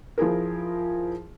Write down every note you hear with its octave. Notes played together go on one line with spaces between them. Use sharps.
F3 E4 G#4 A#4